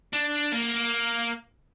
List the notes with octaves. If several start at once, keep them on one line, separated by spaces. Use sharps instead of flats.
D4
A#3